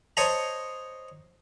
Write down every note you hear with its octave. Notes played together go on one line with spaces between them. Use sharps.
C5 C#5 D#5 A5 A#5